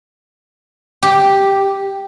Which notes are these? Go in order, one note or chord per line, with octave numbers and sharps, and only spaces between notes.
G4